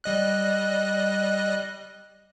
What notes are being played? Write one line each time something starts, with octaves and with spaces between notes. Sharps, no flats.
G3 D#5 F#6